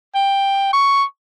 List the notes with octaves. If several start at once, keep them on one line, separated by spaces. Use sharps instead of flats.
G5
C#6